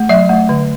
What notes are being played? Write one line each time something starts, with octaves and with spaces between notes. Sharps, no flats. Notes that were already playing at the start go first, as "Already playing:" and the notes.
Already playing: A3
F#3 E5
A3
D3